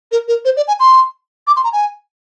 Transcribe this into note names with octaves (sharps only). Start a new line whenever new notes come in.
A#4
A#4
C5
D5
G#5
C6
D6
C6
A#5
G#5